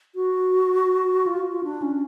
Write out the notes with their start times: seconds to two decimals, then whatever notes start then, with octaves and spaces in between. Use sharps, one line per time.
0.15 F#4
1.27 F4
1.52 F4
1.64 D4
1.82 C#4